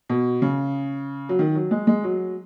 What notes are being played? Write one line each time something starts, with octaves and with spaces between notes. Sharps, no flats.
B2
C#3
F#3
D#3
F#3
G#3
G#3
F#3